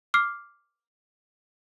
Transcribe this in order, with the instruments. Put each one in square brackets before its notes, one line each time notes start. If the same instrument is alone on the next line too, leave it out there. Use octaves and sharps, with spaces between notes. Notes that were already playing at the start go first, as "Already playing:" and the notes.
[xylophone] D6 F6 C7